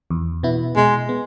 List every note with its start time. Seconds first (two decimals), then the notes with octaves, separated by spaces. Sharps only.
0.10 E2
0.43 B2 B3 E4
0.76 B2 G#3
1.09 B3